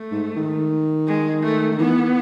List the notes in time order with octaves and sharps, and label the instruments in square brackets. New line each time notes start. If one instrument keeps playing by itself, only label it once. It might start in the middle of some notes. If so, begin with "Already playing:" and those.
Already playing: [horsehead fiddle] A3
[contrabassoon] G#2
D#3
[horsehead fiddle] G#3
A3
[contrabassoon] D#3
[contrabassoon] E3 [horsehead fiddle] B3